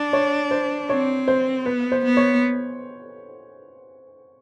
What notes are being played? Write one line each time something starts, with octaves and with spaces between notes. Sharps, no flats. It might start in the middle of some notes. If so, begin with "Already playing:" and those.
Already playing: D4
C#5
C5
C4 C#5
C5
B3 B4
C5
B3
C#5